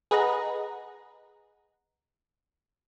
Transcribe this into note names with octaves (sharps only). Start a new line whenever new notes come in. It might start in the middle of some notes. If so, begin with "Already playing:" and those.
G#4 B4 D#5 F#5 A#5